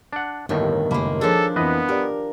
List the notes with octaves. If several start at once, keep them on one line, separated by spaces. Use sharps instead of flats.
D4 F#5
G1 D#2 A2 D#3
F#1 G#3 A#3 B5
F3 D4 G#4 A4 C#5
F2 E3 B3 B4 D#5
G4 A#4 D5